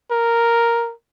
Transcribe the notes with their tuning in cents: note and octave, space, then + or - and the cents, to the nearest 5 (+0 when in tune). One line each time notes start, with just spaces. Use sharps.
A#4 +0